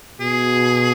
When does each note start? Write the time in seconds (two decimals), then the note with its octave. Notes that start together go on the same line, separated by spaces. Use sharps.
0.20 B2 G#4